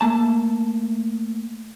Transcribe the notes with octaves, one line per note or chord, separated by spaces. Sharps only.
A3 A#3 A5